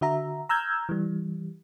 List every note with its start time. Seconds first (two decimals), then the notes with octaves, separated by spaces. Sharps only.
0.01 D3 F#4 E5 A#5
0.49 A#5 E6 F6 G6 G#6
0.89 E3 G3